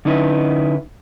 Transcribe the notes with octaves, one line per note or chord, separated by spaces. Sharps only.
D3 C#4 D#4 E4 B4